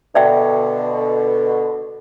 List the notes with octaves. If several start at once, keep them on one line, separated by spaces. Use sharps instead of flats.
B2 D3 D5 E5 G5